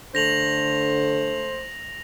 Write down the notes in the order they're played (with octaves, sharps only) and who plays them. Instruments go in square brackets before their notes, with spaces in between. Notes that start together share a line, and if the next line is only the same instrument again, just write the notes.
[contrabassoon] D3 [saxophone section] A3 C5 [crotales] A#6 F7 F#7